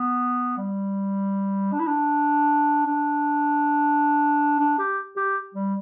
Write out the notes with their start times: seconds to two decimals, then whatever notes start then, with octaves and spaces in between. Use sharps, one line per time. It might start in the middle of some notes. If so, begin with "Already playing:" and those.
Already playing: B3
0.57 G3
1.72 D4
1.80 E4
1.87 D4
2.87 D4
4.59 D4
4.79 G4
5.17 G4
5.55 G3